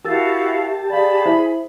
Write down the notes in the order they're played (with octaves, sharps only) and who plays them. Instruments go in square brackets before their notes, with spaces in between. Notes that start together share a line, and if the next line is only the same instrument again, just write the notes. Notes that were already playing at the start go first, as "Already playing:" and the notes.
[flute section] E4 F#4 F5 [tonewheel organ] G4 A5 [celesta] A#4 E6 A6
[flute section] G#4 B5 [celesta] D5 F5
[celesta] E4 C5 E5